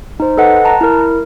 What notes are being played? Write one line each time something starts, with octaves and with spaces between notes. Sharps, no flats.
D#4 C5
A4 B4 D#5 F#5
A5 A#5 F#6 A#6
E4 A#4